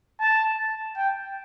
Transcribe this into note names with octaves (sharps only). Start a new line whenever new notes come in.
A5
G5